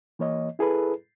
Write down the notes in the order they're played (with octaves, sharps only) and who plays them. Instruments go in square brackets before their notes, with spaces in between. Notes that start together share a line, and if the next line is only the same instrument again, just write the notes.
[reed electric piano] E3 A#3 C#5 D#5
E4 G#4 A4 B4